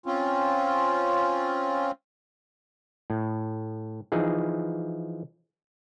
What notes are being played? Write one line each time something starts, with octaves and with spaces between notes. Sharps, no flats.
C4 C#4 F4
A2
E3 F3 D#4 G#4